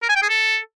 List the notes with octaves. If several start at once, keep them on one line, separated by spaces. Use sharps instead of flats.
A#4
G#5
G5
G#4
A4